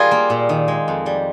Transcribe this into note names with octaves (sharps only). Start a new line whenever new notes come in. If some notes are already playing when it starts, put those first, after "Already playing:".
Already playing: G3 F4 G#4 A#4
A#3
A#2
D#3
G#3
F2
G3